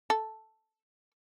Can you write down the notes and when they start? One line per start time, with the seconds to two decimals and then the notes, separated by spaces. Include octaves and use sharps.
0.10 A4